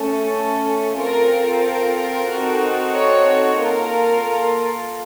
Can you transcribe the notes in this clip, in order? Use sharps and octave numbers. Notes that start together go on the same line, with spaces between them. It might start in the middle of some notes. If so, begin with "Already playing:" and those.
Already playing: A3 C#4 A4
C4 F4 A4 A#4
A#4
C4 D#4 F#4 A4
C#5
A#3 F4 A4 A#4